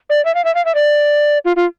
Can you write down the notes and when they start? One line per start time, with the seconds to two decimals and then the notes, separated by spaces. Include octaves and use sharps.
0.10 D5
0.25 E5
0.35 F5
0.45 E5
0.55 F5
0.65 E5
0.75 D5
1.45 F4
1.56 F4